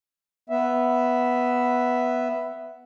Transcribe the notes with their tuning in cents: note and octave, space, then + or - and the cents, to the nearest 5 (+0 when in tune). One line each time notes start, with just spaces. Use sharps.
B3 +0 E5 +0